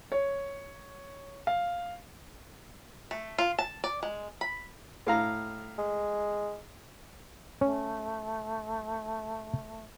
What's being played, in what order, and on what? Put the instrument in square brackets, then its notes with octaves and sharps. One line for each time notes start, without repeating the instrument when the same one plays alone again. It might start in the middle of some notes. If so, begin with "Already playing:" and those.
[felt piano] C#5
F5
[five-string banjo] A3
F4
A5
D5
G#3
B5
[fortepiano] A2 F5 A#5
[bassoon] G#3
[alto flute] A3 [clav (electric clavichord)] C#4